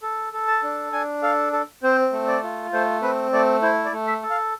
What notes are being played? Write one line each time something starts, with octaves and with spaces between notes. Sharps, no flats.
A4
A4
A5
D4
D4 G#5
A4 F5
A4
C4 C5
A3
D5
F4
A3 C5
C4 B4
A3 D5
E4 C5
D5
A3
E5
A4
F5